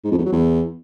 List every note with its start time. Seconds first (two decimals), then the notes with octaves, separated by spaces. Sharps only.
0.04 G#2
0.11 F2
0.18 E2
0.25 F#3
0.32 E2